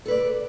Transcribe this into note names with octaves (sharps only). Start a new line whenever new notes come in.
A4 B4 D5